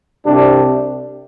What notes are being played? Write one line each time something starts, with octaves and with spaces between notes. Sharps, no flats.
C2 C3 G3 D4